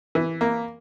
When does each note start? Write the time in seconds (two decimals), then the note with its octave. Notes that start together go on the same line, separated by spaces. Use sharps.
0.15 E3
0.41 A#3